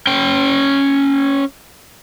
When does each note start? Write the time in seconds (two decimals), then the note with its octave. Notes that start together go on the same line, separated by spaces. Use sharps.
0.07 C#4 G5